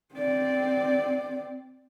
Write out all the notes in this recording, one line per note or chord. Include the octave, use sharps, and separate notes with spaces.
C4 D5